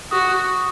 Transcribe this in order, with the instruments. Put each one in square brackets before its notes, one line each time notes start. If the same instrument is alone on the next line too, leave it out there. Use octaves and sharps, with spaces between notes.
[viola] F#4 [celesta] D#6
[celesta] C#6
D#6